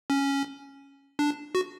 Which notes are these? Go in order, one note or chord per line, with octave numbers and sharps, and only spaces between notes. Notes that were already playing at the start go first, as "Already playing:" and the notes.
C#4
D4
F#4